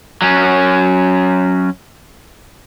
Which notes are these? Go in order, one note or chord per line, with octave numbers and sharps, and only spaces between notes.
F#3 C#4